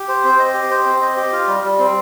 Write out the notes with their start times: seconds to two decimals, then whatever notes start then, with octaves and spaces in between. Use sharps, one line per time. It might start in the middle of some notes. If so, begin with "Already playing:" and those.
Already playing: G4
0.08 C5
0.24 C4
0.39 D#5
0.54 G4
0.70 C5
0.85 C4
1.01 D#5
1.17 G4
1.32 F4
1.47 G3
1.63 G3
1.79 C4